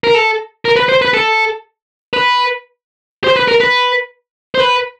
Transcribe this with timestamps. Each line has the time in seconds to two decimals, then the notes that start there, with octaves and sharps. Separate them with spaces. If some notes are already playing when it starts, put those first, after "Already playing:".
0.04 A#4
0.15 A4
0.65 A#4
0.76 B4
0.89 C5
1.02 B4
1.14 A4
2.13 B4
3.24 C5
3.36 B4
3.48 A#4
3.60 B4
4.55 C5
4.60 B4